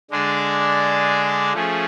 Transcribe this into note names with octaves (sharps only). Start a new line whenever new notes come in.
D3 G#3 D4 G#4 D5
F3 A3 C#4 G#4